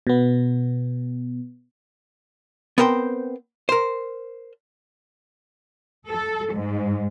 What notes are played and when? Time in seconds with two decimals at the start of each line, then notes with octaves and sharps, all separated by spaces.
0.07 B2 B3
2.78 B3 C4 A#4 C5 G5
3.69 A#4 C5
6.10 A4
6.54 G#2